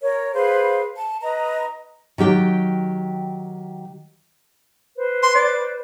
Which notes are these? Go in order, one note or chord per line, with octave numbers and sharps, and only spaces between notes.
A#4 C#5
G#4 B4 C5 F5
A5
B4 D#5 A#5
D#3 F#3 G4 G5
B4 C5
C6
D5